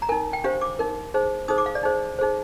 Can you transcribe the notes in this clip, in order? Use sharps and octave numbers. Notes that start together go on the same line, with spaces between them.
A#5
D#4 A#4 G#5
G5
D4 G4 C5 F5
D6
D#4 A#4
D#4 G#4 C5
D#4 G#4 C5 D#6
D6
F5
D5
D#4 G#4 C5
D#4 G#4 C5